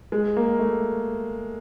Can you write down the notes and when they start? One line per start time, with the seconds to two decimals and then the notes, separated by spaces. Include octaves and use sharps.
0.12 G#3
0.37 A#3
0.59 A3